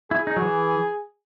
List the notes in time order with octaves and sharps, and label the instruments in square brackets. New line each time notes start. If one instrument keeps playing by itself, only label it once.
[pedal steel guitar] E4 [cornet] G#4
[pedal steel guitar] D#4
F#3
E3